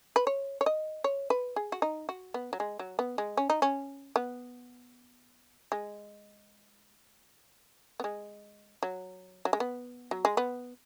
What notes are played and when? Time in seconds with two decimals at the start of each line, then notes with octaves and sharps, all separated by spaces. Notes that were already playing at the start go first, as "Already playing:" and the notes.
0.16 B4
0.27 C#5
0.61 C#5
0.66 D#5
1.04 C#5
1.30 B4
1.56 G#4
1.72 F#4
1.82 D#4
2.09 F#4
2.34 B3
2.53 F#3
2.60 G#3
2.79 F#3
2.99 B3
3.18 G#3
3.37 C#4
3.50 D#4
3.62 C#4
4.16 B3
5.72 G#3
8.00 B3
8.04 G#3
8.83 F#3
9.45 F#3
9.53 G#3
9.60 B3
10.11 F#3
10.25 G#3
10.37 B3